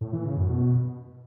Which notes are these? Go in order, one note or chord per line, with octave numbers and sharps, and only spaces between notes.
A2
E3
C#3
F#2
B2